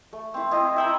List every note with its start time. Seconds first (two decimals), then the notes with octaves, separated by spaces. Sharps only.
0.13 A3
0.34 C4 E4
0.51 C4 E4 D#5
0.76 E4 E5 G5 A#5